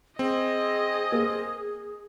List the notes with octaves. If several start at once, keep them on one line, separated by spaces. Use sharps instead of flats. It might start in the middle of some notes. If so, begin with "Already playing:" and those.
C4 G#4 D#5
A#3